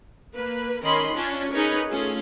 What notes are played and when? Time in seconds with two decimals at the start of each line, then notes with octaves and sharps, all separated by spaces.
0.35 A#3 B4
0.83 D#3 C#4 A#4 D#5 B5 C6
1.14 C#4 D4 F4
1.51 C#4 D#4 G#4 A#4 B4 C#5
1.88 A3 C#4 F4 G#4